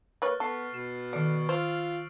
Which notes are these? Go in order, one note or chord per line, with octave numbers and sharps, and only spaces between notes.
A#3 B4 C#5 F6 F#6 A6
B3 A4 C#6 C7
B2 E7
D#3 A3 D5 F6 D7
F4 C5 E6 C7